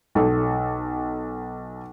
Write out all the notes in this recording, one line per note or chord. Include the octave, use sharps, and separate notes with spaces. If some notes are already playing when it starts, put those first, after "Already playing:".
B1 A4